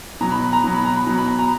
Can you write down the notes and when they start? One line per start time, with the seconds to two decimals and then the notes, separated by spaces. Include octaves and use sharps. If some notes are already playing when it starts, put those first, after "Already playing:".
0.21 B2 F#3 A#5
0.31 B5
0.42 B5
0.53 A#5
0.64 B2 F#3
0.74 B5
0.85 A#5
0.96 B5
1.07 B2 F#3 A#5
1.18 B5
1.28 A#5
1.39 A#5